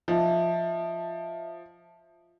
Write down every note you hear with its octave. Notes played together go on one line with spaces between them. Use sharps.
F3 D#5 E5 A5